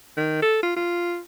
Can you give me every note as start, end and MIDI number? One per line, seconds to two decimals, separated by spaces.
0.17 0.40 51
0.42 0.60 69
0.63 0.74 65
0.77 1.19 65